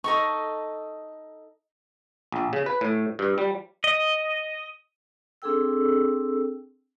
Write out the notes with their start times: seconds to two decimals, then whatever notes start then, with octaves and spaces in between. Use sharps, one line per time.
0.04 D#4 A4 D#5 C#6
2.32 A#1
2.53 C#3
2.66 B4
2.81 A2
3.19 G2
3.38 G3
3.84 D#5
5.42 C4 D4 G#4 A4 G5 E6